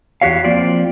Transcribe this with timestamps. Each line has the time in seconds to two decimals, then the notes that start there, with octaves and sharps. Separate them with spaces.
0.21 E2 F#4 G4 C#5 F5
0.44 F3 A#3 C4 F4 D5